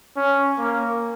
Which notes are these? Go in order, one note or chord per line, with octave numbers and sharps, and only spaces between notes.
C#4
A#3